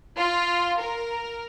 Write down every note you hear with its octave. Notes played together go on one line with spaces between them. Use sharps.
F4
A#4